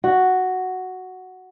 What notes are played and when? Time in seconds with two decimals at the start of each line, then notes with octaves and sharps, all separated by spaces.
0.04 F#4